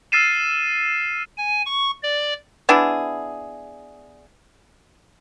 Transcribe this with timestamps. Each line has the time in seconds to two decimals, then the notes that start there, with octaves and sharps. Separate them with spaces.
0.12 E6 F6 A6 C7 D#7 E7
1.38 G#5
1.66 C#6
2.03 D5
2.69 B3 D4 E4 G#4